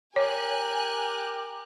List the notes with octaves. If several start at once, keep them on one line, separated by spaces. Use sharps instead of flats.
G4 A#4 C#5 G#5 F#6